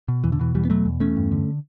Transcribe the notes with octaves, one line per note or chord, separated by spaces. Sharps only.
B2
E2 E3
D3
B2 E3
E2 E3 G3
B3
B2 F#3 A3
E2
E2 A3 C#4
G2
D3